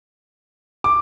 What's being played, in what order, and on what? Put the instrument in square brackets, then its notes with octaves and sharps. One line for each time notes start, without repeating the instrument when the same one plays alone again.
[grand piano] D6